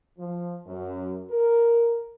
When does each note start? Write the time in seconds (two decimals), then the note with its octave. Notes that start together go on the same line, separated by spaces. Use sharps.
0.18 F3
0.67 F#2
1.31 A#4